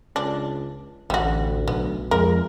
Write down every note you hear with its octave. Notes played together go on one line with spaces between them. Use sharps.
C#2 D4
A1 D2 G3 F#4
B1 B3
F2 G#3 A#4